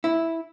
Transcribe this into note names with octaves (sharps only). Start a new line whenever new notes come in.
E4